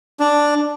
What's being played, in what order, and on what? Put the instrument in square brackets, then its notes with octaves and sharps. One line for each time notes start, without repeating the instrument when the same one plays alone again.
[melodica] D4